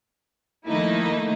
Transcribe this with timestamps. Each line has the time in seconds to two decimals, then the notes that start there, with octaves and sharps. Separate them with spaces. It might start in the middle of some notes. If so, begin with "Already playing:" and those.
0.68 D#3 F3 A3 A#3 D#4 E4